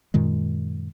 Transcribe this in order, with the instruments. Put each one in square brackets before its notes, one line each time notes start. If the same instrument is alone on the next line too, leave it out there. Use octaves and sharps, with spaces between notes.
[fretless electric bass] F#2 A#2 D#3 G#3